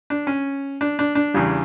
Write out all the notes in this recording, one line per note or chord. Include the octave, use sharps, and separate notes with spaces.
D4
C#4
D4
D4
D4
E2 C#3 G3